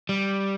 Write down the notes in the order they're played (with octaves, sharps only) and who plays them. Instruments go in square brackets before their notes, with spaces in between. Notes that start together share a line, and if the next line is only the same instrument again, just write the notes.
[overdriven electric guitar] G3